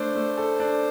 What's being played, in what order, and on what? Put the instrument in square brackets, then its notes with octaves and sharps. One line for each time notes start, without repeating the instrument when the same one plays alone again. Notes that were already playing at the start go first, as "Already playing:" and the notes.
Already playing: [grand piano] A3 D4 [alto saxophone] C5
[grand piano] A3
A4
D4